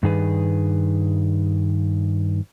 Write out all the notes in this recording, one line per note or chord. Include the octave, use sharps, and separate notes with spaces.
G2 D#3 G#4 B4